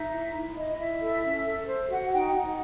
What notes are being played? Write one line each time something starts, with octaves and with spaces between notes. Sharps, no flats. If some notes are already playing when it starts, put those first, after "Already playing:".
Already playing: D#4 E5
E4
E4
E4 D#5
E4 E5
A4
C#4
A4
C5
F#4 F#5
D#4 G5
D#4 F#5